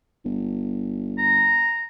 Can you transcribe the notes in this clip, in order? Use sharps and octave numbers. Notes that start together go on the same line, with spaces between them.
G1
A#5